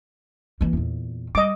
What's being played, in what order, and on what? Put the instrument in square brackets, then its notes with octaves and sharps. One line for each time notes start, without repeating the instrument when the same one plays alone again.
[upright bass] E3 A#3
E2 A#2
[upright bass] G3 [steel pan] D#5 D6